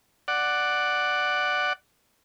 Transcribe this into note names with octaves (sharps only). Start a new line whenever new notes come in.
D5 F#5